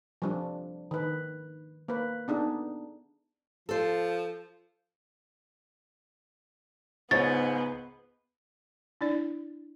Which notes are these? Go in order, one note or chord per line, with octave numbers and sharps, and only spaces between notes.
F3 G3 D4
D#3 B4
A#3 B4
B3 D4 D#4 G#4
F3 A4 C5
C#2 G#2 B3 C#5 C#6 A6
D4 E4 D5